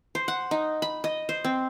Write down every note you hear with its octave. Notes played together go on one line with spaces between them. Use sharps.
C5
F#5
D#4
B5
D#5
C5
C4